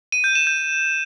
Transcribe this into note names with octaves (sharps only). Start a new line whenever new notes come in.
D#7
G6
E7
G6